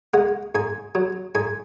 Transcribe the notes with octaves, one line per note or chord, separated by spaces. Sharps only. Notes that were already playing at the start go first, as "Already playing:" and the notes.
G#3 F#5
G#2 G#5
F#3
G#2 G#5